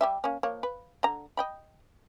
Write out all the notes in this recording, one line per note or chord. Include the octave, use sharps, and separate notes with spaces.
G3 G4 E5
A#3 C#4
F3 A#3 C#5
B4
D3 A#5
D#5 G5 B5